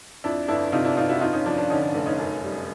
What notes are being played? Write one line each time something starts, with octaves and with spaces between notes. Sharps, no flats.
F2 D4 E4
G1 D4 E4
C3 D#4 F4
D4 E4
G1 D#4 F4
E4 F#4
F2 D#4 F4
C#4 D#4
F3 D4
D4
D3 C#4 D#4
C#4
F1
C#4 D#4
F#2
G3